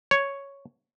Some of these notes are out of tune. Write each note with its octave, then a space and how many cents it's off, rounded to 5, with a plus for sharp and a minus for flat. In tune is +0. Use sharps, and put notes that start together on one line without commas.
C#5 +0